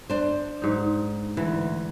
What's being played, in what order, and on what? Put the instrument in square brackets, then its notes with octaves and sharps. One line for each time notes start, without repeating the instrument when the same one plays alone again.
[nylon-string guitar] D4 C5
[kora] G#2 D#4
[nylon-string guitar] D2 [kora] E3